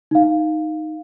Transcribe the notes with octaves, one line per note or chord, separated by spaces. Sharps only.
D#4 F5